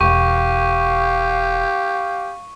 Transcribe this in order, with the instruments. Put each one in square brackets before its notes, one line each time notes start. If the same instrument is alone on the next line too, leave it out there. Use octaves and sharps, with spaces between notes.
[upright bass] E1 [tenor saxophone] G4 [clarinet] F5 [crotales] C#6